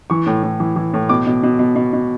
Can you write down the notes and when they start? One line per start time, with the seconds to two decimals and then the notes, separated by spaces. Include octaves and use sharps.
0.10 E3 C#6
0.27 A2
0.43 A2
0.60 E3
0.76 E3
0.94 A2
1.09 B2 D6
1.27 B2
1.43 B2
1.59 B2
1.76 B2
1.93 B2